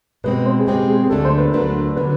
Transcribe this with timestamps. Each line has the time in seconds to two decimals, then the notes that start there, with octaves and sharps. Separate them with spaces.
0.24 B2 G#3 C4 B4
0.46 C5
0.59 G#4
0.67 B2 G#3 C4 G4
0.88 G#4
1.03 G#4
1.09 D2 D3 F#3 A3 D4 A4
1.25 C5
1.38 B4
1.48 A#4
1.53 D2 D3 F#3 A3 D4 B4
1.97 D3 F#3 B4